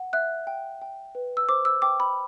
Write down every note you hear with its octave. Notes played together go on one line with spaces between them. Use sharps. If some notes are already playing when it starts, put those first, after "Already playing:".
Already playing: F#5
E5 F#6
G5
G5
B4
E6
C5 D6
E6
G5 D6
B5